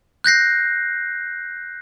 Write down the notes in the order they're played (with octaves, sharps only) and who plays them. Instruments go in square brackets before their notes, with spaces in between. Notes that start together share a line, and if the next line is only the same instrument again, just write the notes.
[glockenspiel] F#6 G6 A#6 C7